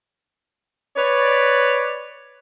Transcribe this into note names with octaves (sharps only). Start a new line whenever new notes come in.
B4 C#5 D5